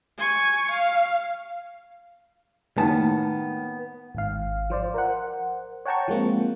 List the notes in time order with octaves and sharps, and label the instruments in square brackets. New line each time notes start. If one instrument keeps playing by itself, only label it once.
[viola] G#5 C#6
F5
[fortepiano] A2 D#3 A#3 [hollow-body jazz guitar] B3 A5
[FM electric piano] G#1 G#2 F5
F3 C5 D5
A#4 C5 F#5
C#5 F#5 G5 A5 A#5 C#6
F3 G#3 A#3 C4